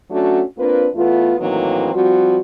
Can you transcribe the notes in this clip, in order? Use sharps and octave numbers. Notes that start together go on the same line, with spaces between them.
F#3 A3 C#4 D4 F#4
A#3 C4 D4 F4 B4
E2 A3 B3 F4
A2 D#3 E3 F#3 A#3 C4
F3 G3 C4 F#4